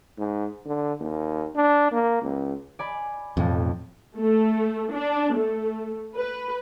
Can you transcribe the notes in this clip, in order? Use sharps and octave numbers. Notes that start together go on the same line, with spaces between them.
G#2
D3
D#2
D4
A#3
C#2
D5 G#5 B5
B1 F2 A2 F3
A3
D4
A3
B4